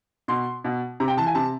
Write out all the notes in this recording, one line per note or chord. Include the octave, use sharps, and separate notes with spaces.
B2 C6
B2
C3 A#5
G5
E3 A5
G#5
C3 A5